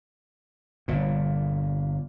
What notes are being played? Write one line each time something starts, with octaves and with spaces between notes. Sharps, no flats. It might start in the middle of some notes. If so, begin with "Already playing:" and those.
G1 A#2